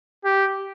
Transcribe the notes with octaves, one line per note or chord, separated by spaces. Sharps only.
G4